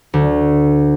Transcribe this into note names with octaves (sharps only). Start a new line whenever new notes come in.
D2